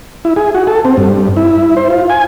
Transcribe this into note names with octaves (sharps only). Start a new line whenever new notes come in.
E4
G#4
F#4
A4
C4
G2
E4
C5
F4
G#5